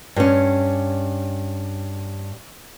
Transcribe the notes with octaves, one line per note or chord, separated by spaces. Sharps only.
G2 C#4